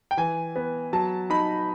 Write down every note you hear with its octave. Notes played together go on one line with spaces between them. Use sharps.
G5
E3 G#5
B3
F#3 A5
D#4 B5